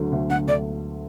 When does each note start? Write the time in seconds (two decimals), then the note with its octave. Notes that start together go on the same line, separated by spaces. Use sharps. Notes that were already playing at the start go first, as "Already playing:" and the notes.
Already playing: D2 D3 F#3
0.12 D2
0.30 D2 F#5
0.47 D2 D5